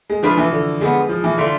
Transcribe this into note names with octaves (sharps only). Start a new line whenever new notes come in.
G#3
F3 A3 D4 F4 B4
E3
D3
D3 F3 G#3 B3
F3
E3
D3 A3 D4 F4